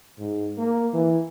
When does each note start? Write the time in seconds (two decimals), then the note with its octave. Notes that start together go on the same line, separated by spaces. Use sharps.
0.19 G#2
0.58 A#3
0.94 E3